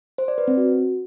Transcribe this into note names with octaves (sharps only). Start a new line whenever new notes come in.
C5
D5
B4
C4
F#4